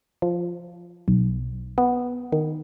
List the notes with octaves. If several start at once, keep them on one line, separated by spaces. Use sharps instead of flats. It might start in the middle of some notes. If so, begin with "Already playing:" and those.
F3
B1
B3
D#3